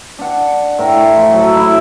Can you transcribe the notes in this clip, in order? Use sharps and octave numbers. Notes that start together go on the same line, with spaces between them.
D4 F#5
A2 G5 A#5 C#6
F3
F#3 A4
E4